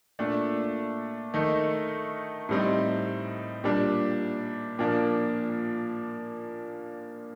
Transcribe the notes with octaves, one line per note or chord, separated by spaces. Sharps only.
A#2 A3 D4
D#3 A3 D#4
A2 G3 C4 D#4
A#2 G3 D4
A#2 F3 A#3 D4